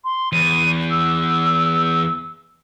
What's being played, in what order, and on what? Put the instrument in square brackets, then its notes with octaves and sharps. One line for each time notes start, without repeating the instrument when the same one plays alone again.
[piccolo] C6
[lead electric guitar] E2 [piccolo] D#7
[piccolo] E6